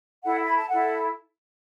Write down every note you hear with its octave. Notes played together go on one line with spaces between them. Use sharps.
E4 A4 F#5
B5
A5
E4 A4 F#5